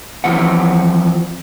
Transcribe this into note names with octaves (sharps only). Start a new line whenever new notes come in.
E3 F3 C4 F#5